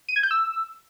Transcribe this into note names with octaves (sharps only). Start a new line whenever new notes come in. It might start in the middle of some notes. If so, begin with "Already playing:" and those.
D#7
G#6
G6
E6